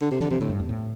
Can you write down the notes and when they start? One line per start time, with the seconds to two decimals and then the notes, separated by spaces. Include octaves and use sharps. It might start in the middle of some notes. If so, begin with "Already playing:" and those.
0.01 D3
0.11 C3
0.20 D3 E3
0.30 C3 E3
0.40 A2 D3
0.49 G2
0.60 E2
0.69 A2